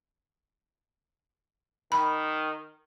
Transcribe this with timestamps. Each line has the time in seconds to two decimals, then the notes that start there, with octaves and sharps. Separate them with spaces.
1.92 D#3 B5